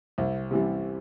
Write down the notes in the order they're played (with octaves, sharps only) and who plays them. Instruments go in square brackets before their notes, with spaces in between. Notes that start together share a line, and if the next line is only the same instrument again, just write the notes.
[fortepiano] C2
C3 E3 G3